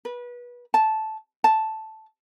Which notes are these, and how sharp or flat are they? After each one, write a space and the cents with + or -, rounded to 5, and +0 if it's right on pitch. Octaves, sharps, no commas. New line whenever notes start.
B4 -25
A5 -10
A5 -5